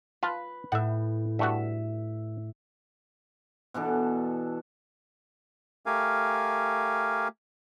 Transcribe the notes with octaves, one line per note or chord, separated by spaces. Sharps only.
F4 B4 A5
A2 E5 F#5
G2 A3 F#4 E5
B2 E3 D4 A4
A3 G4 A#4 F5 G#5